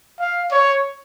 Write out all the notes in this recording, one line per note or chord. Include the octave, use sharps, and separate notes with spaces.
F5
C#5